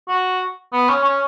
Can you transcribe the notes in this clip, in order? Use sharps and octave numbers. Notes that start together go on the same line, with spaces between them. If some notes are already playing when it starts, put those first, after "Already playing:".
F#4
B3
C#4
C#4